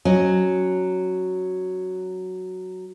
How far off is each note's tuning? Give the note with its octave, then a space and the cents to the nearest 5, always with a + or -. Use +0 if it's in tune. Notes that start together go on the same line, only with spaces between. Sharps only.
F#3 +0 C#4 +0 D#5 +0